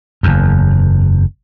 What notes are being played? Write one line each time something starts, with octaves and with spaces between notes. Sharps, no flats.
F#1 E2